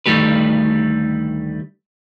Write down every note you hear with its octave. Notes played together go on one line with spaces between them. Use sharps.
D2 D#3 G3 A3 G4 B4